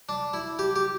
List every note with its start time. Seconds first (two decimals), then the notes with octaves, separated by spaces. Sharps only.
0.09 D4
0.33 E4
0.59 G4
0.76 G4